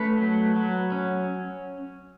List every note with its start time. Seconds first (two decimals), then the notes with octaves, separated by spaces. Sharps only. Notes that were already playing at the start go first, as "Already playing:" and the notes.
Already playing: A3 C#4 B4
0.18 F#3
0.56 F#3
0.92 C#4